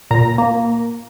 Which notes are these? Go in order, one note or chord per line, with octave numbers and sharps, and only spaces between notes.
A#2 A#5
A#3